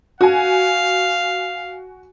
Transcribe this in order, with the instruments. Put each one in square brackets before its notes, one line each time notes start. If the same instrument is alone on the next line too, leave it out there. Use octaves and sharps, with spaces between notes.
[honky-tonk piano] F#4 G#5 [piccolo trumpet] F5